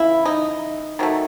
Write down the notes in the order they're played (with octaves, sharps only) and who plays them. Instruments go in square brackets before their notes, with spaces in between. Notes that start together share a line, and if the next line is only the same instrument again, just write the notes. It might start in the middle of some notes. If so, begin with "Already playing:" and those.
Already playing: [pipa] C#3 E3 E4
D#4
D#3 F#3 A3